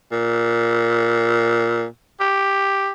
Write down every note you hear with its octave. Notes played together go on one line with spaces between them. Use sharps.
A#2
G4